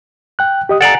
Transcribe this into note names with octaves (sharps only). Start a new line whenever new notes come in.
G5 F#6
G4 D#5 D#6
A4 D5 F5 F#5 G#5 A#5